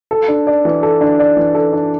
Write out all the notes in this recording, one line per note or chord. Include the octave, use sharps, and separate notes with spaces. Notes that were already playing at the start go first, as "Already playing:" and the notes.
A4
D4
D5
E3
A4
D4
D5
E3
A4
D4